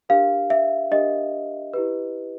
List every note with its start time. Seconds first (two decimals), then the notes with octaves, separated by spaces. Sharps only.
0.09 D4 G4 A#4 F5
0.50 E5
0.91 D4 G4 A#4 D#5
1.74 E4 G4 B4